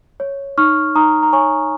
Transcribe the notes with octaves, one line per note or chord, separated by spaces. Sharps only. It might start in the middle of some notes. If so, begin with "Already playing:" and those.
C#5
D#4 C#6 F6
D#4 A#5 D#6
A#5
C#5 G#5 C#6